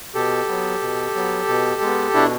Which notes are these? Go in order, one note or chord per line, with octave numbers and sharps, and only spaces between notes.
B2 G4 A4
F#3 B3
B2
F#3 B3
B2
G#3 B3
B2 D4 E4